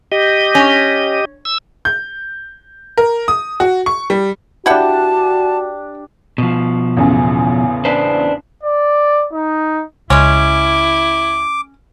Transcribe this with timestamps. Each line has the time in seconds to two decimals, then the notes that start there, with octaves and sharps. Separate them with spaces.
0.12 G4 D#5
0.55 C#4
1.45 E6
1.85 G6
2.98 A#4
3.28 D#6
3.60 F#4
3.86 C#6
4.10 G3
4.66 D4 E4 F#4 G4 F#5 G5 A5
6.38 B2 F3
6.97 A1 E2 C#3
7.85 D4 B4 C5
8.63 D5
9.33 D#4
10.10 C#2 G#3 C#4 E4 D6